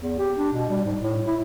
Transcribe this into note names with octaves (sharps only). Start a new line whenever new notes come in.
E2
G4
D4
B2
G3
G#2
A2
E4